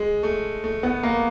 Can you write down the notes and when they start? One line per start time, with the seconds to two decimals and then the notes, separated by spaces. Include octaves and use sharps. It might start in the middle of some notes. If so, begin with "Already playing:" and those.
Already playing: G#3
0.23 A3
0.64 A3
0.83 B3
1.03 A#3